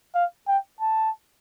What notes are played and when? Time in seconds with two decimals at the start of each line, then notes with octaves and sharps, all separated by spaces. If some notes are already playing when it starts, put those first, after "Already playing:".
0.15 F5
0.48 G5
0.81 A5